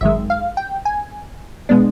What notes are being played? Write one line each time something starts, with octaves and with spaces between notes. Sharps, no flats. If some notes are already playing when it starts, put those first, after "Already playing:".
G#1 F#2 D#3 G#3 E5
F5
G5
G#5
B2 G#3 B3 D4